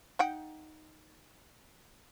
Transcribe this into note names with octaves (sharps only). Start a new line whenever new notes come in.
D#4 F#5 G5